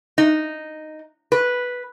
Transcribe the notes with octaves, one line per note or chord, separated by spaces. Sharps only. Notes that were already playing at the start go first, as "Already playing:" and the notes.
D#4
B4